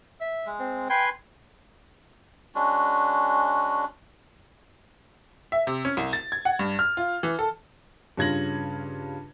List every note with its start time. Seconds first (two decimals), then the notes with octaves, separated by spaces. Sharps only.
0.21 E5
0.46 G#3
0.60 C4
0.90 B4 G5 G#5 C6
2.55 G#3 C#4 D4 F#4
5.52 E5
5.67 C3
5.85 C#4
5.97 C2
6.13 A6
6.32 G#6
6.45 F#5
6.59 G2
6.79 F6
6.97 F4
7.23 E3
7.39 A4
8.17 G2 C#3 F4 G#6 A#6 F#7